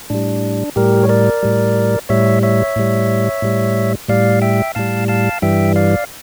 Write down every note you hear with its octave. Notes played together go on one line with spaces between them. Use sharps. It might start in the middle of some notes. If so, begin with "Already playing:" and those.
A2 G3 D4
A2 G3 G4 A#4
C#5
A#4 D5
A2 G3
A2 G3 C#5 E5
C#5 E5
A2 G3
A2 G3
A2 G3 D5 F5
E5 G5
A2 G3 F5 A5
F5 A5
G2 E3 G3 E5 G5
D5 F5